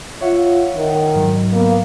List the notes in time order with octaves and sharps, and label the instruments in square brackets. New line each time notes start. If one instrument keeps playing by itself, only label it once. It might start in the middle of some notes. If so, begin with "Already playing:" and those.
[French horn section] F4 [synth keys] C#5 E5 F#5
[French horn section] D#3
[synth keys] G#2 F#3
[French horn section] A#3 B3